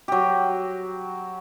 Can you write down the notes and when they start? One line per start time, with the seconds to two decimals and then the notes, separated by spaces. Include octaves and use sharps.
0.08 F#3 G4